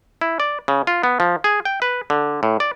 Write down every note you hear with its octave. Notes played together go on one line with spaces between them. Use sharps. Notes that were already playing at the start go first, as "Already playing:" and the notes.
E4
D5
C#3
F4
B3
F3
G#4
G5
B4
D3
A2
D5